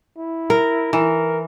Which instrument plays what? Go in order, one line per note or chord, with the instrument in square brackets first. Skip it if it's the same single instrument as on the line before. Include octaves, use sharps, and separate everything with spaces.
[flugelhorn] E4
[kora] A#4
[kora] E3 [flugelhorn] A#4